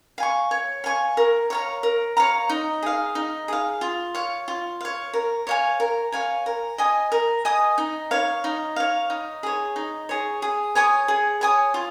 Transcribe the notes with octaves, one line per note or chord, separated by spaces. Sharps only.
F5 G#5 C#6
C#5
F5 G#5 C#6
A#4
C#5 F5 A#5
A#4
C#5 F5 A#5
D#4
G#4 F5
D#4
G#4 F5
F4
C#5 F5
F4
C#5 F5
A#4
C#5 F5 G#5
A#4
C#5 F5 G#5
A#4
D#5 G#5 D#6
A#4
D#5 G#5 D#6
D#4
C#5 F5
D#4
C#5 F5
D#4
G#4 C#5
D#4
G#4 C#5
G#4
C#5 G#5 D#6
G#4
C#5 G#5 D#6
F4